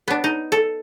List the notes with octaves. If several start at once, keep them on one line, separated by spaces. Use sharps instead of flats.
B3 D4
D#4
A4